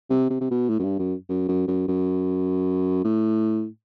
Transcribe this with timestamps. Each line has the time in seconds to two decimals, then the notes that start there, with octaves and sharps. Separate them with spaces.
0.10 C3
0.30 C3
0.41 C3
0.50 B2
0.69 A2
0.79 F#2
0.83 G2
0.99 F#2
1.29 F#2
1.48 F#2
1.68 F#2
1.88 F#2
3.04 A2